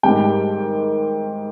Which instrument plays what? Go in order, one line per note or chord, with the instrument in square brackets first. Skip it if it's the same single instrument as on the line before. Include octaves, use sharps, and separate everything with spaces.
[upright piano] G#2 D#3 G3 G5